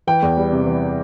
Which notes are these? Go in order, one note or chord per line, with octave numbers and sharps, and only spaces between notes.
E3 G5
E2
G3
C3
E3